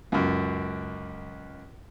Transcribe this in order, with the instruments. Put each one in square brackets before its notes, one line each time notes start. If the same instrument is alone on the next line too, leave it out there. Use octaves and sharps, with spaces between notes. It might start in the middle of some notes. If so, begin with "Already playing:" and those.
[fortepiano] C#2 F#2